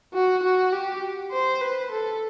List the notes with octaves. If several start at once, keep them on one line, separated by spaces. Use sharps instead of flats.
F#4
F#4
G4
C5
B4
A4